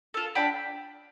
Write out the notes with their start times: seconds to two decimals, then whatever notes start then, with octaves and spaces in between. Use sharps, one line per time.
0.14 F4 A4
0.35 D4 G5 B5